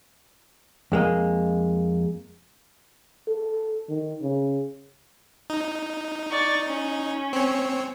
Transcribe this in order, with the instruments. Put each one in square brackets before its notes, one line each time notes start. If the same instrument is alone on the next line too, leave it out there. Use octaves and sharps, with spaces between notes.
[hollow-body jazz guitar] F2 G#3 A#3 D#5
[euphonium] A4
D#3
C#3
[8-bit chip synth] D#4
[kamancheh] D5 C#6
C#4
[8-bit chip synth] C4 C#5